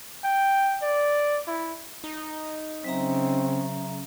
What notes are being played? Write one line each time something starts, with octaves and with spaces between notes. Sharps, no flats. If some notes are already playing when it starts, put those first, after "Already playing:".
G5
D5
E4
D#4
C#3 F#3 C4 E5 A#5